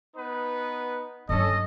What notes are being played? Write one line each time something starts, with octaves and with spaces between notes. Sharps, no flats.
B3 D#4 B4
G2 F#3 C#4 A4 D#5